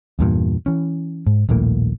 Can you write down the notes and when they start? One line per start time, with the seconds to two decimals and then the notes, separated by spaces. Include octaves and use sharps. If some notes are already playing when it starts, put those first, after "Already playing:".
0.19 E2 G2 A#2
0.66 E3 C#4
1.27 G#2
1.49 D#1 A#1 A2 A#3